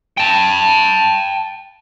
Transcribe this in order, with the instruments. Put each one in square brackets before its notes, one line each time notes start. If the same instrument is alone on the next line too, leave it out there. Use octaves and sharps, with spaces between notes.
[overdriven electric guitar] G5 A5